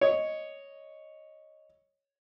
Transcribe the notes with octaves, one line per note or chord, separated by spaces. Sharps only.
C#5 D#5